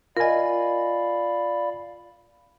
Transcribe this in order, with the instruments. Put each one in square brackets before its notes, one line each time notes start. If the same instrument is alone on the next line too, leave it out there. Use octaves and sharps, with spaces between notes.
[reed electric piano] F4 G#5 [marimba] A#4 D#5 [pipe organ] D5 F5 B5